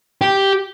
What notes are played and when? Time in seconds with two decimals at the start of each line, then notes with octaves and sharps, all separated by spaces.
0.21 G4